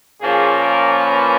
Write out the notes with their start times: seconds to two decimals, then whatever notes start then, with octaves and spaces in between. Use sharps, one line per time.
0.21 A#2 F3 A#3 C#4 G#4
0.61 A#4
1.02 B4